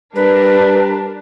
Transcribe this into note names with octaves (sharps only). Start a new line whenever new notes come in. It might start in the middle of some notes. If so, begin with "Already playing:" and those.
G3 D4 A#4 B4